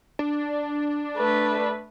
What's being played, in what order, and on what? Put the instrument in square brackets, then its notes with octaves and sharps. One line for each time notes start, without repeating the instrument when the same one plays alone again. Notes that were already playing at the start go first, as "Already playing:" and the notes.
[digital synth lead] D4
[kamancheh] A3 B4